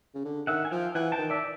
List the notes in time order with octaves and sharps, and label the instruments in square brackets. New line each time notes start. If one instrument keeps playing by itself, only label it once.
[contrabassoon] C#3
D3
[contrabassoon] D#3 [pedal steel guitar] E5 F#5
[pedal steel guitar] G#5
[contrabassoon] F3 [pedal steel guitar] F5 G5
[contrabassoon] E3 [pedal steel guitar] F#5 G#5
[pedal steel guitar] G5 A5
[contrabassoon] D#3
[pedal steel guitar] D5 E5